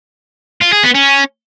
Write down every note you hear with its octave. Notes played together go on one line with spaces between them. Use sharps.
F4
G#4
B3
C#4